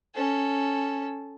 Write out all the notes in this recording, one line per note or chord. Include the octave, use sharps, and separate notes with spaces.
C#4 A4